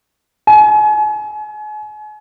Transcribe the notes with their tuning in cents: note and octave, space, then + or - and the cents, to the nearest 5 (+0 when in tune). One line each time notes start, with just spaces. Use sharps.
G#5 +35